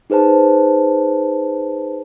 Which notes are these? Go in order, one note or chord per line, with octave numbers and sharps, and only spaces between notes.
D#4 G#4 B4 C5 A5